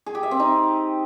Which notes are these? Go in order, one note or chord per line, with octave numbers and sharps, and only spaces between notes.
G#4
G4
E5
C4
D#4